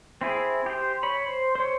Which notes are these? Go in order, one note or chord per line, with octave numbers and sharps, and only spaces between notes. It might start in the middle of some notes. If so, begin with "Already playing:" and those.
C4 E4 G#4
G4 C5
C#5 B5
C5
C5 C#5